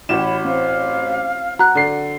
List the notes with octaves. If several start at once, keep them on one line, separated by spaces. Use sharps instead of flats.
A1 E4 F#4 C#5 G5 E7
B5
C4 F5
F#4 F#5 A#5 F#6
D3 C7